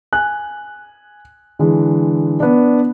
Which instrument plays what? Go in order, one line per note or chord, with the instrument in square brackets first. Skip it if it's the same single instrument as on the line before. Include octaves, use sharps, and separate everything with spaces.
[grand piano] G#5 F#6
D3 E3 G#3
B3 D4